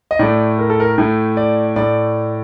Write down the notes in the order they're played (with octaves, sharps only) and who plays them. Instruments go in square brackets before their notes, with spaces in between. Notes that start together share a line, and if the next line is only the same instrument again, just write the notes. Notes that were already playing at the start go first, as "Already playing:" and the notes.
[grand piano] D#5
A2 A3 D5
A#4
A4
A#4
A2 A3
D5
A2 A3 D5